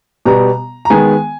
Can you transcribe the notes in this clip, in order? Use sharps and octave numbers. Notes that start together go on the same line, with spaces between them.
B2 G3 B3 A#5
A#5
D#3 G#3 B3 G#5